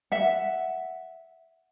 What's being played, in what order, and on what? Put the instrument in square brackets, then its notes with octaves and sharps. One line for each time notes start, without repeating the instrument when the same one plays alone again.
[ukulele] E5 F#5